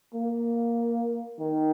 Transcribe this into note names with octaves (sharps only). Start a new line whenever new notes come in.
A#3
D#3